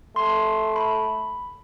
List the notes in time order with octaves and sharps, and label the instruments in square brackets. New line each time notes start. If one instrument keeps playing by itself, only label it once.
[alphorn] A3 [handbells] C6
[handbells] B5